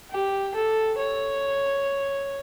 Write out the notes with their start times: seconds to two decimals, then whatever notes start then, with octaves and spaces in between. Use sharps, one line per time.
0.10 G4
0.55 A4
0.98 C#5